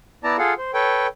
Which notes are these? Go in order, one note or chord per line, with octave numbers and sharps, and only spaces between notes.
B3 E4 D5 A5 A#5
F4 G#4 A4 F5 F#5
C5
A4 B4 C#5 G5